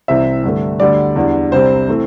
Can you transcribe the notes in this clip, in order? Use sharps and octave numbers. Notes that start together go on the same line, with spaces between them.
C2 C3 E3 C4 E5
G2 D3 A3
D2 D3 G3 D5
E2 D3 G3 D4
C2 C3 G3 C4 C5
E3 A3 C4